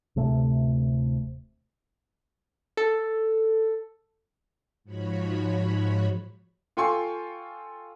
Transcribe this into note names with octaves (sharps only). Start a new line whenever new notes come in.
D1 C3 A3
A4
G#2 F3 F#4 C#5 B5
F4 A4 G5 G#5 C6 C#6